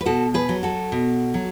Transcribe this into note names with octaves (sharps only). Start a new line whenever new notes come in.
B4
B2 F#4 A4
G#4 B4
F#3
F#4 A4
B2
F#3